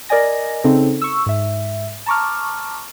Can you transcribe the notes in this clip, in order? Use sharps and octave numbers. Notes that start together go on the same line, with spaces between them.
A#4 D5 D#5 G#5 A#6
C#3 C4 D#4 A4
C#6 E6
G#2 E5
A5 A#5 C#6 D6 F6